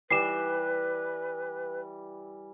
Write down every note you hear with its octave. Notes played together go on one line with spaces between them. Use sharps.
E3 G3 B4 C7 E7